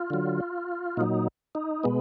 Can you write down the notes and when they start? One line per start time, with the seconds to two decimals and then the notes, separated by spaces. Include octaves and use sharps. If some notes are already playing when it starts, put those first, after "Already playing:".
Already playing: F4
0.10 D3 F#3
0.97 A#2 F#3 D#4
1.55 D#4
1.84 B2 G#3 B3